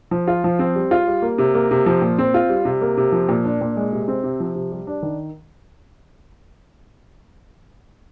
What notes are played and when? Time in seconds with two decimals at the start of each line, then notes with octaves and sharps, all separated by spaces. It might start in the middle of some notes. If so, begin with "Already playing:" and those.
0.11 F3
0.28 F4
0.44 F3
0.59 C4
0.75 G3
0.91 F4
1.07 G3
1.22 A#3
1.38 C3
1.55 A#3
1.71 C3
1.86 F3
2.02 A#2
2.18 C4
2.34 F4
2.49 G3
2.65 C3
2.81 A#3
2.97 C3
3.12 F3
3.29 A#2
3.45 D4
3.61 A#2
3.76 G#3
3.93 C3
4.08 C4
4.24 C3
4.40 F3
4.55 C3
4.72 G3
4.87 D4
5.03 D#3